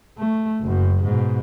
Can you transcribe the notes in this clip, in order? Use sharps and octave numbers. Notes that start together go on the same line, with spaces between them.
A3
F#1 F#2
G#2 B2